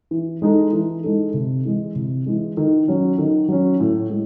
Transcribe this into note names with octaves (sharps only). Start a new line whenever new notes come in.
E3
G#3 D#4 A4
E3
G#3 D#4 A4
C3
E3 G#3
C3
E3 G#3
D#3
F#3 C#4
D#3
F#3 C#4
A2
G#3